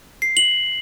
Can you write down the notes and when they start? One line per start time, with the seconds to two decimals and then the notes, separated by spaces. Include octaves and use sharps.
0.22 C7
0.37 F#7